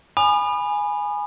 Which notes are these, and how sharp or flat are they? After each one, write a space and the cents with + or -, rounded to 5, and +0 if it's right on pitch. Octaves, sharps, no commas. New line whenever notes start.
G#5 +0 B5 -5 D#6 -40